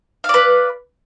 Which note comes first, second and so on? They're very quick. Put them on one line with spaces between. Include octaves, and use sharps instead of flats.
F5 D5 B4